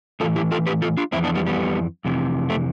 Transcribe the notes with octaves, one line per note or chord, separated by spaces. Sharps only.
A2 E3 F4 A4
E4 G4
F4 A4
G4 B4
F4 A4
D4 F4
F2 E3 C4 E4
B3 D4
G3 B3
G3 B3
F2 C3 E3
A3 C4